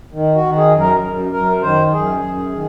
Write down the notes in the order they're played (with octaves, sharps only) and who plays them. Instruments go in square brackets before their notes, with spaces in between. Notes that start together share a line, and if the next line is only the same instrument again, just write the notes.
[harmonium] D#3
F#4
D#3
G#4
F#2
A#4
F#2
F#2 A#4
D#3 C5
F#2 G#4
F#2
D#3